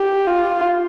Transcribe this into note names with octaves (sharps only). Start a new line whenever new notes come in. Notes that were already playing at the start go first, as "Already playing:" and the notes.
Already playing: G4
F4